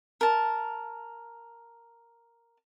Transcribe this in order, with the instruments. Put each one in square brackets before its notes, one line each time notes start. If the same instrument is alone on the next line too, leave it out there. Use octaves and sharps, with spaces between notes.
[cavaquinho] A#4 A5